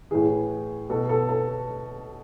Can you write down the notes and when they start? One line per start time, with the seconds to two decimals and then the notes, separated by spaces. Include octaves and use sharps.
0.11 A2 E3 G#4
0.90 B2 A4
1.09 A4
1.29 A4